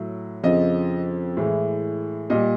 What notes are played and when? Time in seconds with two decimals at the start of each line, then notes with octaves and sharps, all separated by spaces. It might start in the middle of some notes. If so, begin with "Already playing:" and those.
Already playing: A2 F#3
0.44 F2 C#3 F3 D#5
1.37 A2 E3 G#3
2.30 A#2 G3 D#5